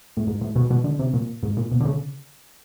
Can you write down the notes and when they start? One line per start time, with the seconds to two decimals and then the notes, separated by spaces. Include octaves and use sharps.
0.17 A2
0.27 G#2
0.41 A2
0.56 B2
0.70 B2
0.84 D3
0.99 C3
1.14 A#2
1.43 G#2
1.57 A#2
1.71 B2
1.81 D3
1.85 C#3